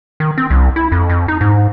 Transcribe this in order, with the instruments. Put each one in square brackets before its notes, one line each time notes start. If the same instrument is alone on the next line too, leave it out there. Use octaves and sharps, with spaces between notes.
[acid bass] D#3
C4
C2
E4
F2
F2
D#4
G#2